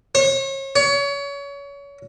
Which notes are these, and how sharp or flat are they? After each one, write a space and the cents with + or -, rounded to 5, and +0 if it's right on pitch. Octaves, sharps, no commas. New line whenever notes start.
C#5 -35
C#5 +30